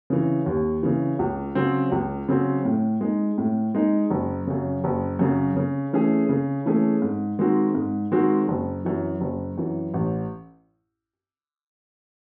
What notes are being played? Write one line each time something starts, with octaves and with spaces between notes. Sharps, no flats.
C#3 E3
D#2
C#3 E3
C#2
C#3 F#3 C4
C#2
C#3 F#3 C4
A2
G#3 D#4
A2
G#3 D#4
F#1
F#2 C#3
F#1
F#2 C#3
C#3
E3 A3 C#4 G#4
C#3
E3 A3 C#4 G#4
G#2
D#3 G#3 C4 F#4
G#2
D#3 G#3 C4 F#4
F#1
F#2 E3
F#1
F#2 E3
A1